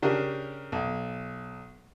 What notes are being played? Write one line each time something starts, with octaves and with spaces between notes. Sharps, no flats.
C#3 D4 G4 A#4
B1